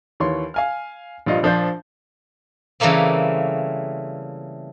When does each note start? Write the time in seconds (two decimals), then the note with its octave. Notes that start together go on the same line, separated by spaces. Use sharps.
0.20 D#2 E3 C#5 C6
0.54 F5 G#5 F6
1.26 A#1 G2 F4 D#5
1.43 A#1 F3 D4 C5 G6
2.80 C#3 E3 G3 A3 A#3 C4